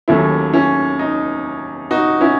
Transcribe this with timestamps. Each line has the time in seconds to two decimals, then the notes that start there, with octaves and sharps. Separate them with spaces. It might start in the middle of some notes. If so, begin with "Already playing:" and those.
0.08 D#2 D#3 F#3 A3 C#4 E4
0.53 C#4 E4
0.99 D#4
1.91 D#4 F#4
2.21 C#4 E4